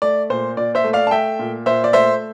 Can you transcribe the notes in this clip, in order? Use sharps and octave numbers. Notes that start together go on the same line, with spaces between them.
A3 D5
A#2 C5
A#2 D5
C5 E5
A3
D5 F5
A5
A3 E5 G5
A#2
A#2 C5 E5
D5
A3 C5 E5